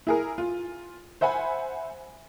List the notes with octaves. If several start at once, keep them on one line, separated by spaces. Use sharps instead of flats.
E4 G#4 A#4
F4
C5 E5 F#5 G#5 B5